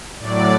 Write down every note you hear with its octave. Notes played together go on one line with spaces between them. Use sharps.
A2 F#3 D5